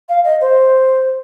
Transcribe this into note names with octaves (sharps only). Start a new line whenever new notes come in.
F5
D#5
C5